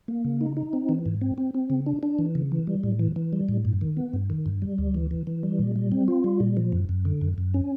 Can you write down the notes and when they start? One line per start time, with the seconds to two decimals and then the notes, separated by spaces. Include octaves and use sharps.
0.08 A#3
0.25 C#3
0.41 D#4
0.57 D#4
0.73 C4
0.89 E3
1.06 G#2
1.21 C4
1.38 C4
1.54 C4
1.70 C#3
1.86 D4
2.03 D4
2.19 E3
2.35 C#3
2.52 E3
2.67 G3
2.83 A2
2.99 E3
3.16 E3
3.33 G3
3.49 A2
3.65 G2
3.81 D#3
3.97 B3
4.14 G2
4.30 D#3
4.46 G2
4.62 G3
4.78 D2
4.95 E3
5.11 E3
5.27 E3
5.43 G3
5.59 A#2
5.76 G3
5.92 C4
6.08 F4
6.24 G3
6.40 A#2
6.57 F3
6.72 F#2
6.89 F#2
7.05 D3
7.21 F#2
7.38 F#2
7.54 C#4